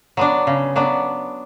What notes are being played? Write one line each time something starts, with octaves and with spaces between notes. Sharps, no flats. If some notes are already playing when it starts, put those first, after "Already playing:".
F#3 B3 D4
C#3
F#3 B3 D4